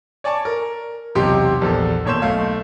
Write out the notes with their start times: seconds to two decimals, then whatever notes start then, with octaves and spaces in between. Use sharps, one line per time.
0.24 C#5 D5 G#5 A5 C#6
0.45 A#4
1.15 B1 E2 C3 G4 C6
1.61 A#1 E2 A4
2.05 E1 D#2 C#5 C6 G6 E7
2.22 B1 A3 F5